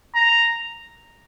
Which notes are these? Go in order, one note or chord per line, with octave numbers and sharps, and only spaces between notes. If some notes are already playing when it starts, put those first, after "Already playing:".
A#5